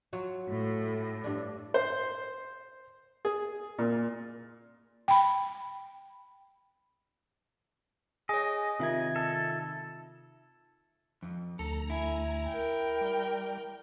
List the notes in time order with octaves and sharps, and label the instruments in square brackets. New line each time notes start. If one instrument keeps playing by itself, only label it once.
[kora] F#3 F4 F#4
[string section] A2
[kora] G2 D4
[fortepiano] C5
G#4
A#2
[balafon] G5 B5
[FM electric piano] G#4 [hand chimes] C#5 G#5 [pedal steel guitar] D#5
[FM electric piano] C3 D#3 D#4 [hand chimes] F4 E5 G#6
[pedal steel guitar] A4
[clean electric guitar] F2
[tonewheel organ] D2 A#5 [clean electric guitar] A4
[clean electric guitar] E4 [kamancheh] G#5
[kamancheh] A#4 G5
[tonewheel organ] G3